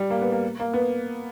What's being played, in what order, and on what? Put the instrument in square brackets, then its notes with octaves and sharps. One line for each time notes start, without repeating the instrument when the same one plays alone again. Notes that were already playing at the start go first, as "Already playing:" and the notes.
Already playing: [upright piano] G3
A#3
B3
A#3
A#3
B3